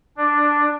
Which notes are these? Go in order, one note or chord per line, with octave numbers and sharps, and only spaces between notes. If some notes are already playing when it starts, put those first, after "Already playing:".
D4